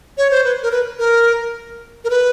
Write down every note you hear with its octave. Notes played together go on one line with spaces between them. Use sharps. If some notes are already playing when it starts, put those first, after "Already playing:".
C#5
C5
B4
A#4
B4
A#4
A#4
B4